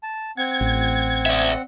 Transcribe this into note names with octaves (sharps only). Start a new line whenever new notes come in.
A5
C4 F#5 G#6
A1
D5 E5